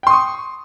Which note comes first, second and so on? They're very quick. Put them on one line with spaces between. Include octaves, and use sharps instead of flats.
G5 C6 D#6 C#6